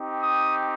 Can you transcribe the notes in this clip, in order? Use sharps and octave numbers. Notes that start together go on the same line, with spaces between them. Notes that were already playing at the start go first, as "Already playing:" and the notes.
Already playing: C4 D#4 G4
D#6